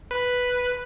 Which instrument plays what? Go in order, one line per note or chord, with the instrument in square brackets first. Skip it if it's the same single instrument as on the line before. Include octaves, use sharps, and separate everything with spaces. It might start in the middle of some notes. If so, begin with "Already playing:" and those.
[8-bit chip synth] B4